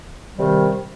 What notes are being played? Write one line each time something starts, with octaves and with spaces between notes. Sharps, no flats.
C3 D#3 G3